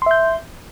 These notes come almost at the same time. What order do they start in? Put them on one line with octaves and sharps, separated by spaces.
C6 E5 G6